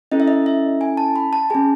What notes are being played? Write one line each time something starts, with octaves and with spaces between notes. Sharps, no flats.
C#4 E4 A4 D#5
E5
D#5
E5
G#5
A5
B5
A5
C#4 G#4 G#5